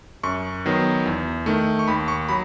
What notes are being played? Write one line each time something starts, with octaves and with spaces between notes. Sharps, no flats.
F#2 C#6
D#3 F#3 B3
E2
D#3 A3
C#6
D#2 B5
C#6
F#3 B5